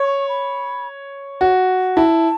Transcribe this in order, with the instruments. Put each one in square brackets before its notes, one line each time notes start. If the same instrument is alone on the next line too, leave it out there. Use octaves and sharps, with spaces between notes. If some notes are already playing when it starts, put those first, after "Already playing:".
Already playing: [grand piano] C#5 [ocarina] C#6
[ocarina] B5
[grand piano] F#4
[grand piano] E4 [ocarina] A5